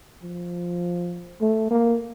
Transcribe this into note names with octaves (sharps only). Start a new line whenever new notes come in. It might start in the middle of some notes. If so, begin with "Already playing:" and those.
F3
A3
A#3